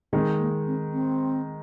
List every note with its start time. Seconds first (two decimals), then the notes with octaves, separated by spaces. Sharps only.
0.13 D#3 G#3 C4 D#4
0.39 A#3
0.67 C4
0.93 C4